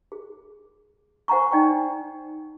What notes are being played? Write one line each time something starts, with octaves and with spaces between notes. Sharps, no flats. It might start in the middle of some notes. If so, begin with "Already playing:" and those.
G#4
C5 F#5 G#5 A#5 C#6
D#4 D5 G5 C#6